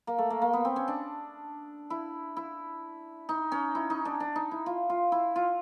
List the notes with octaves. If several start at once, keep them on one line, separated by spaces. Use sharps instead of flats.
A#3
A3
A#3
A#3
B3
C4
C#4
D4
E4
E4
D#4
C#4
E4
D#4
D4
D4
D#4
E4
F4
F4
E4
F4